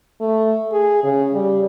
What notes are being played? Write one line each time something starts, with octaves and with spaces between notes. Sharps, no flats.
A3
G#4
C#3
G3